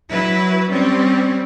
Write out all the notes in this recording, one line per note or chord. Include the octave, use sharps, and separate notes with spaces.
F#3 E4 B4
G3 C4 C#4